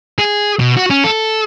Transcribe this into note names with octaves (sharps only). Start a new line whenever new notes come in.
G#4
B2
F#4
C#4
A4